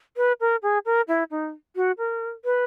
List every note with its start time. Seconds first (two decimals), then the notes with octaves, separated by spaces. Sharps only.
0.17 B4
0.40 A#4
0.63 G#4
0.86 A#4
1.08 E4
1.31 D#4
1.76 F#4
1.98 A#4
2.45 B4